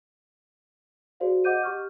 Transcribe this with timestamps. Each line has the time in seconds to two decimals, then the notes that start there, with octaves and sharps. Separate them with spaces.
1.20 F#4 G#4 C5 D5 F5
1.44 D#5 F#5 D6 G6 D#7
1.63 G4 C#6 F6